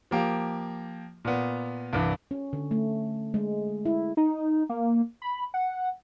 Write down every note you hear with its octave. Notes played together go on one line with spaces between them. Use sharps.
F3 A#3 G4
A#2 B3
C2 G2 E3
C#4
D3
A3
G#3
E4
D#4
A#3
B5
F#5